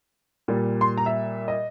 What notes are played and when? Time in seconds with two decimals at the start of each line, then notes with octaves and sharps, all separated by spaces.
0.48 A#2 G3
0.81 C6
0.97 A#5
1.06 E5
1.48 D#5